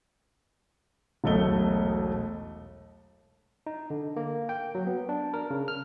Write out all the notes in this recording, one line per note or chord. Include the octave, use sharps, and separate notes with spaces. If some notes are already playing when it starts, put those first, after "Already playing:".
E1 B1 A3 D#5 G7
D#4
D3
A#3
G5
F#3
B3
D4
A#4
C#3
F6